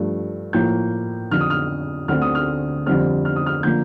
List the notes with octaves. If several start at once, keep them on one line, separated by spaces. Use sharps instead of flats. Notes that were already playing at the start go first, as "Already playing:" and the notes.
Already playing: G2 F3 A3
A2 F3 A#3 G6
F2 D3 F3 F6
D#6
F6
D2 D3 A3 C4 F6
D#6
F6
F2 D3 G3 C4 F6
F6
D#6
F6
D3 F3 A#3 G6